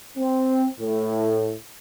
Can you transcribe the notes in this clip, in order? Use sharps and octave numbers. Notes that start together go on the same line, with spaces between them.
C4
A2